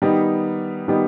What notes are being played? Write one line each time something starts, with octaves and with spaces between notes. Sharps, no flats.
D#3 G3 B3 D#4 G4
D#3 G3 B3 D#4 G4